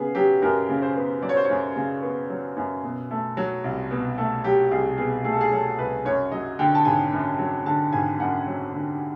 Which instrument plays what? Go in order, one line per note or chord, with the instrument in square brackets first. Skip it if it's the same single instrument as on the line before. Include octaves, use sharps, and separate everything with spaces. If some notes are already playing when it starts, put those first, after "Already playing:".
Already playing: [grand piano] C#3 B3 G#4
F#3 G4
F#2 A#4
C#3
C5
B3
F#3 D5
C#5
C5
C#5
F#2
C#3
B3
F#3
F#2
B2
A3
F#3
C2
B2
A3
F#3 G4
C2 G#4
B2 G#4
A3 G#4
A4
G#4
F#3 A4
C2 B4
F#2 C#5
F#3 D#5
D3 G5
A5
G#1 G#5
F#2
F#3
D3 A5
G#1 G#5
F#2 F#5
F#3
D3